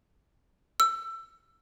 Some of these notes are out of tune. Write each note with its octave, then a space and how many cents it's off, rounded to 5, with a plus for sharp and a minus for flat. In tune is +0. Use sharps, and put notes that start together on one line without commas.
E6 +20